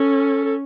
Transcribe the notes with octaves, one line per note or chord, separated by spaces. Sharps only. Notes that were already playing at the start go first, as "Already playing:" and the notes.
Already playing: C#4 A4
A4